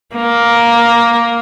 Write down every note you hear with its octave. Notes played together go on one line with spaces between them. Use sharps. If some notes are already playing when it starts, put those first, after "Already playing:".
A#3